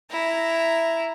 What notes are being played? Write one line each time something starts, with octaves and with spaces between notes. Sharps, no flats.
E4 A#5